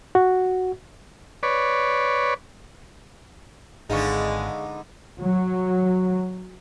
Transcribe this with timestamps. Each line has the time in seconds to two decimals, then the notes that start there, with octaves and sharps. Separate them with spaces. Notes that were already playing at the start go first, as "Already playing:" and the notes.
0.15 F#4
1.43 B4 C#5 D5
3.90 G#1 D3 G#3 B3 D#4 G#4 F5 C#6
5.20 F#3